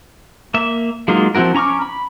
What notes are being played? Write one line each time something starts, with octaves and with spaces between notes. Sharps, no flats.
A#3 E5
F#3 G#3 A#3 D#4 F4
F3 C4 E4 F#4 A#4
C#4 A#5 C#6 D6 F6
B5